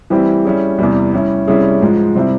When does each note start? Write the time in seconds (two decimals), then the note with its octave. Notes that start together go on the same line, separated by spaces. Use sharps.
0.10 E3 G3 C4 E4 G4
0.45 G3 C#4 E4 G#4
0.78 E2 C3 E3 G3
1.14 G3 C#4 E4
1.47 C3 G3 C#4 E4 G#4
1.81 G#2 F3 G#3
2.15 C3 G3 C4 E4